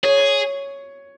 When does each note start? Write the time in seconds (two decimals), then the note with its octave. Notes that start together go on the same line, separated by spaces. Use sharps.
0.03 G#4 C#5